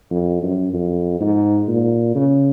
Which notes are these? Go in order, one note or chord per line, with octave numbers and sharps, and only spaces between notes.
F2
F#2
F2
G#2
A#2
C#3